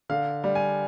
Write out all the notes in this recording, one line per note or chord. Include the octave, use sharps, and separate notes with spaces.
D3 F5
G3
G#5